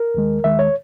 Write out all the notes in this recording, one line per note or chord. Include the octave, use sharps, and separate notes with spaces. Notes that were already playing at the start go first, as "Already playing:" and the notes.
Already playing: A#4
D#2 D#3 G#3
D#2 D#3 G#3 E5
C#5